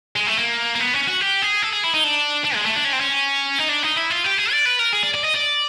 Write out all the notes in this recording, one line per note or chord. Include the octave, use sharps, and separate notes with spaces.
G#3
A3
A#3
A#3
B3
C#4
F#4
G4
G#4
A4
G#4
E4
D#4
D4
D4
G#3
A3
D4
C#4
C4
C#4
D#4
D4
D#4
E4
F4
G4
G#4
D5
B4
A#4
G#4
D5
D5
D#5
D5